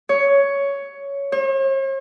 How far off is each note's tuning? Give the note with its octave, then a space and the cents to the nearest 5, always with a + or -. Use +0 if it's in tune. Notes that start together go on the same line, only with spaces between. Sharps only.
C#5 +10
C#5 -45